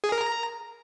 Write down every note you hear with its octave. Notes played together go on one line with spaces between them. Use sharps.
G#4
A#4
A#5